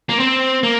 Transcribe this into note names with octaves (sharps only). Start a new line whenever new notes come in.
A#3
C4
A#3